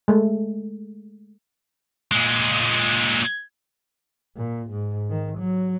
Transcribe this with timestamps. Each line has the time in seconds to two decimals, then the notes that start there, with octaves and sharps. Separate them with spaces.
0.08 G#3 A3
2.12 A#2 G#3
4.37 A#2
4.70 G#2
5.10 D#3
5.39 F#3